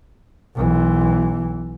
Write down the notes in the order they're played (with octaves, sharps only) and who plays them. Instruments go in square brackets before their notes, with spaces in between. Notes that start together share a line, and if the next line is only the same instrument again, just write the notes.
[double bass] B1 E3